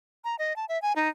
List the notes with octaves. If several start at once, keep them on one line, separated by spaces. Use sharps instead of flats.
A#5
D#5
A5
E5
G#5
D#4